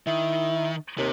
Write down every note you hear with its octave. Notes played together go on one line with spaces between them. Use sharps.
D#3 E4
D#2 C3